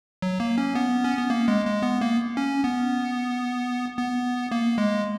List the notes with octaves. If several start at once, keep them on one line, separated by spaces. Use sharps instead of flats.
F#3
A#3
C#4
B3
C#4
B3
A#3
G#3
G#3
B3
A#3
C#4
B3
B3
A#3
G#3